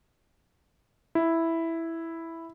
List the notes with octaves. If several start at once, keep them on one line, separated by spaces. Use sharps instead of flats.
E4